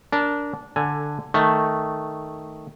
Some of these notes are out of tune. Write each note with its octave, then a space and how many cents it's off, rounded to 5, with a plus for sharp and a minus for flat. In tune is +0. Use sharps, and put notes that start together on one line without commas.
D4 -15 A#4 +0
D3 +0 A4 +15 G#5 +0
D#3 +5 A3 +0